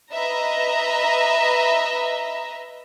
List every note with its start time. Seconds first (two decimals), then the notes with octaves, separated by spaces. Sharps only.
0.12 B4 D#5 E5 A#5